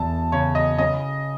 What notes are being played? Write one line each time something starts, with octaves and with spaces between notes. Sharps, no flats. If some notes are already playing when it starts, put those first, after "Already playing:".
Already playing: E2 A5
C#3 C#5
D#5
C#4 D#5